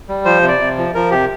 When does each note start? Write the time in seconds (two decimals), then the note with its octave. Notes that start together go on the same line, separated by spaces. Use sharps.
0.09 G3
0.25 F3 C5
0.42 C3
0.48 D5
0.60 C3
0.78 F3
0.94 F3 A#4
1.11 C3 G4